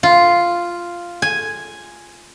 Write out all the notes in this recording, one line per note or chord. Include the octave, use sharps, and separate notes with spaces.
F4
G#5